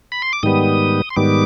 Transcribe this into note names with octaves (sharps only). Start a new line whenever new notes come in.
B5
C6
D6
G#2 D#3 G3 B3 D#6
C6
G#2 D#3 G3 B3 D6